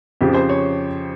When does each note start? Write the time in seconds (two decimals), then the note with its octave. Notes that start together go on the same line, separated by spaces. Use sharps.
0.21 F2 C#3 F3 G4
0.34 C5
0.49 C#5